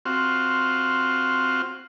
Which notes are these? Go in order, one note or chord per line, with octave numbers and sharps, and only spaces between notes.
C4 F4 F#4